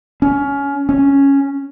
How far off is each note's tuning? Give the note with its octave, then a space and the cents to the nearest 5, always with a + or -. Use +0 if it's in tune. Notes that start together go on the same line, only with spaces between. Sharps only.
C#4 +20
C#4 +0